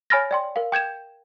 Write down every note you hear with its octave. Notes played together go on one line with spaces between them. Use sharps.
C#5 G#5 B5 F6 A6 A#6
D5 G5 C6
A#4 F5
G5 G6 G#6 E7